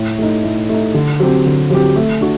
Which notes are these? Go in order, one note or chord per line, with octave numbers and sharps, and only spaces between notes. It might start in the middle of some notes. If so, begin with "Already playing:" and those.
Already playing: A2
A3 D#4
A2
A3 D#4
D3
F#3 C4 G4
D3
F#3 C4 G4
A3
D4 F#4